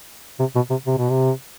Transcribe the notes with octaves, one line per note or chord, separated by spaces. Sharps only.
C3
B2
C3
C3
B2
C3